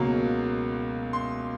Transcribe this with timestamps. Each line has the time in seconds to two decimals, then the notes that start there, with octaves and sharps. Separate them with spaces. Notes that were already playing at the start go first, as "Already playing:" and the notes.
Already playing: C#2 B2 F#3 A#3
1.13 C6